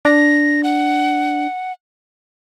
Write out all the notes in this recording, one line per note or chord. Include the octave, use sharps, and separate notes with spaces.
D4 A#6
F#5